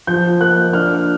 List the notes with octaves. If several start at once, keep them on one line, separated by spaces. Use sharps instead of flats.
F3 G6
A#3 F#6
D4 F6